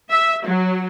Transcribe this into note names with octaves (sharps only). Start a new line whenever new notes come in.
E5
F#3